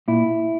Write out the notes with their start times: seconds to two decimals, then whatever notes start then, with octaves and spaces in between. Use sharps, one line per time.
0.08 A#2 E4